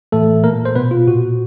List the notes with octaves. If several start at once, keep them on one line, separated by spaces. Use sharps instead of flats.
A2 E3 A3 A4
A#2 A#3 A#4
C5
B2 B3 B4
F4
A#2 F#4